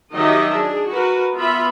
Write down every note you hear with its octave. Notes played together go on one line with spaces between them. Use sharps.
D#3 F#3 D#4 G4 D#5 E5
D4 G#4
F#4 A#4 B4
B3 F4 E5 B5